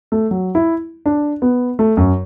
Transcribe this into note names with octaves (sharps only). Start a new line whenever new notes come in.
A3
F#3
E4
D4
B3
A3
F#2